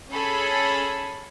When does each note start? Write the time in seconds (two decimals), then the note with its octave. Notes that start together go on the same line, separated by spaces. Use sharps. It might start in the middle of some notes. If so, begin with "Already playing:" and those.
0.12 C#4 G#4 A4 B5